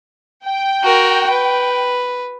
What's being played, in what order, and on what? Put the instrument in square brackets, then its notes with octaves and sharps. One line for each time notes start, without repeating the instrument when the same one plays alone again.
[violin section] G5
[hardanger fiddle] F#4 A#4
B4